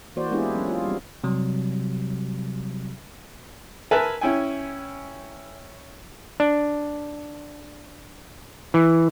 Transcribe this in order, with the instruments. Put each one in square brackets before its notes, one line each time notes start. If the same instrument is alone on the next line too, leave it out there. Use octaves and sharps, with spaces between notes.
[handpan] E3 A#3 F#4 C5 D5
G#3 B3 D4 E4 G4 G#4
F#3 C#4
F4
G3 C4
[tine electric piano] C3 F#3 G3
[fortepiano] A#4 B4 E5 G#5 A5
C#4 E4 G5 G#5
[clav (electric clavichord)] D4
E3